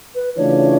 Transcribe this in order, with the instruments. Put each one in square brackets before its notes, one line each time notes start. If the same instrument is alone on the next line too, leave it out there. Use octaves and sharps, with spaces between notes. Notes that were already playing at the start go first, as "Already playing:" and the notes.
[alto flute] B4
[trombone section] C#3 E3 A3 D4 F4 [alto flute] C#5